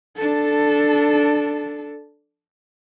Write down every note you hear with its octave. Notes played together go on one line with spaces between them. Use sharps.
D4 A4